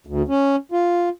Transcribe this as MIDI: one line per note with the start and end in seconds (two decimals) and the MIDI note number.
0.07 0.22 38
0.28 0.56 61
0.72 1.09 65